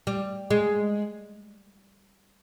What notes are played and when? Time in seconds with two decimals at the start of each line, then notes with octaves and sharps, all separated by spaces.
0.07 G3
0.51 G#3